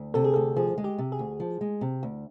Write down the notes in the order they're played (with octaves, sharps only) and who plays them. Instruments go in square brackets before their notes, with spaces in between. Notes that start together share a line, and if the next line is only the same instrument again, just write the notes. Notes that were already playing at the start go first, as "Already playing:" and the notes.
Already playing: [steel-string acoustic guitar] D2
[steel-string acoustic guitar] C3 [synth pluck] A4
[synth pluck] G#4
[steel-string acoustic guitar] D2 [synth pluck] A4
[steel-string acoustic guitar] F3 [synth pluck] G#4
[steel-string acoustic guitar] G#3
[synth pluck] G4
[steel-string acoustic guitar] C3
[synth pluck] G#4
[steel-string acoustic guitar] D2
F3
G#3
C3
D2